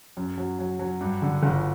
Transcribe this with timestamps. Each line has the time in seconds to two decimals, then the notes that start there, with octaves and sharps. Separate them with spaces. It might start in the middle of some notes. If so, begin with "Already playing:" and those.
0.17 F#2
0.38 F#3
0.59 F#3
0.79 F#3
1.01 G2
1.22 D3
1.43 G1